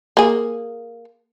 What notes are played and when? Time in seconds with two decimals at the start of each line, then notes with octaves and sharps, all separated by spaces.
0.17 A#3 G#4